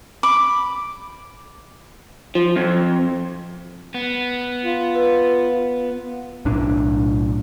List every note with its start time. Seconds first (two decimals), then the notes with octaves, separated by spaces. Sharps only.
0.23 B5 D6
2.35 F3
2.56 F2
3.94 B3
4.64 F4
4.95 B4
6.45 B1 A2 D4